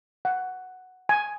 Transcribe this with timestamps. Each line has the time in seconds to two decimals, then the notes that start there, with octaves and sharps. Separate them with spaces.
0.25 F#5
1.09 G#5